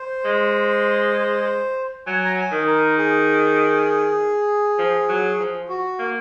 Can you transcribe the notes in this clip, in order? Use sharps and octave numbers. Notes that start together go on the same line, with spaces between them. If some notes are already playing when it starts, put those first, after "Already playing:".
Already playing: C5
G#3
F#3 G#5
A#5
G#5
D#3
A#4
G#4
F3
F#3
F3
F#4
A#3